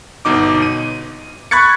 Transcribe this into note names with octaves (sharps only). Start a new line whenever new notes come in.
G1 B2 D#4 D6
D#7
B5 C#6 F#6 G#6 A6 C#7